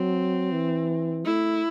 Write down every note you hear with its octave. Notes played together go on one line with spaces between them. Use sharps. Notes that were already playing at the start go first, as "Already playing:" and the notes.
Already playing: F#3 C4
E3
A3 E4